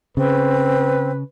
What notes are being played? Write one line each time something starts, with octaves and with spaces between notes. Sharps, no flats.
C#3 C4 B4